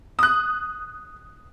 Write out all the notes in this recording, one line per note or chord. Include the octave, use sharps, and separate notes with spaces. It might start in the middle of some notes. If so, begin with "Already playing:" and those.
D#6 F#6